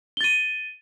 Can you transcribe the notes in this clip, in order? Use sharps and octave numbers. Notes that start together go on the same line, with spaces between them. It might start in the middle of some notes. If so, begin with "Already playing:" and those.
A6 D#7 G7